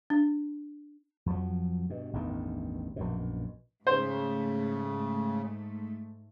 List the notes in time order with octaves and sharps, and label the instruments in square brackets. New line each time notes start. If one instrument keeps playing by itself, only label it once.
[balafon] D4
[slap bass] F2 F3 F#3
G2 B2
A1 E2 G2 D#3
A#1 F#2 B2
[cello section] G#2 A3 [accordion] C#3 [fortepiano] C5